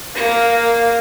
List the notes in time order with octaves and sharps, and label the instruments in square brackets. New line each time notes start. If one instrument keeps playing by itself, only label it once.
[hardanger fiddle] A#3 [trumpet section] F5